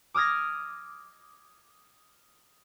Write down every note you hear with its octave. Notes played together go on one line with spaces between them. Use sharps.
D6 D#6 F6 G#6 A#6